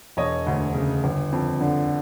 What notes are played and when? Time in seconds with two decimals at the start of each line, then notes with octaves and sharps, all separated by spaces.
0.17 E1 C#5 D#5
0.47 D2
0.74 C#3
1.04 G1
1.32 F2
1.61 D3